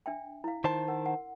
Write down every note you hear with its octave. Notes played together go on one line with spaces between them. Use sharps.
D4 E5 G5
E4 F5
D#3 C5 A5 C6
A#4 F#5
F#5